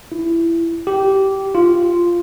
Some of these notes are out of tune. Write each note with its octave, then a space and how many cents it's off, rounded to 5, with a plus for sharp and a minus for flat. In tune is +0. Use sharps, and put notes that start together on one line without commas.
E4 +20
G4 -15
F4 -5